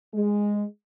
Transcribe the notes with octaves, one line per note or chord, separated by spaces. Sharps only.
G#3